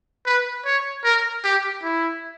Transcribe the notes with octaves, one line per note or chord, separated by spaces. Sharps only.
B4
C#5
A#4
G4
E4